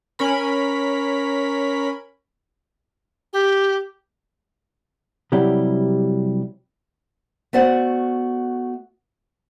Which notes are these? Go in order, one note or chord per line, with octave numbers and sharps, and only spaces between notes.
C#4 A#4 B5
G4
C3 F#3 G3 E4 G4
A3 B3 F#4 C5 D5 F#5